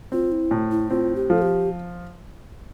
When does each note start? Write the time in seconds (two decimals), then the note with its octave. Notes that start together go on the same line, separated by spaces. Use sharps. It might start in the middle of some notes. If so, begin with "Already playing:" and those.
0.12 C4 F4
0.32 E4
0.51 A2
0.71 E4
0.90 C4 F4
1.16 G4
1.30 F3 A4
1.42 G4